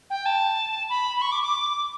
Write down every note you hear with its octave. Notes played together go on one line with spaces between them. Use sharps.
G5
A5
B5
B5
C#6
D6
D6